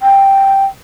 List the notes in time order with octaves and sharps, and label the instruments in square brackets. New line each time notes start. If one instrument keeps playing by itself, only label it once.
[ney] G5